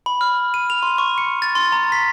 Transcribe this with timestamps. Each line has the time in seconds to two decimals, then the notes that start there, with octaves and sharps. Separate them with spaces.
0.06 B5
0.21 F6
0.54 D#7
0.70 F7
0.83 C6
0.98 C#6
1.18 C#7
1.42 A6
1.55 C6
1.72 A#5
1.92 B6